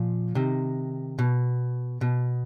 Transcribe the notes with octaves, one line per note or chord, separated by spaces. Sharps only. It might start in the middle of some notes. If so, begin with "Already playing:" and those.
Already playing: A#2 F3
C3 D#3
B2
B2